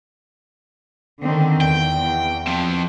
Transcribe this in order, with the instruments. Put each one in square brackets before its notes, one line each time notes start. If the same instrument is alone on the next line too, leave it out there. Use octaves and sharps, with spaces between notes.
[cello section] D3 D#3 C4
[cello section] E2 [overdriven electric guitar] G5
[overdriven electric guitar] F3 C4